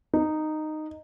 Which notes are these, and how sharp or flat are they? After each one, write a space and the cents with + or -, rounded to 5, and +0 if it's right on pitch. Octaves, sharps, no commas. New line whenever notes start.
D#4 -10